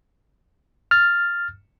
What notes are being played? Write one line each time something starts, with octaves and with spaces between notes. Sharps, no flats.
F6 A6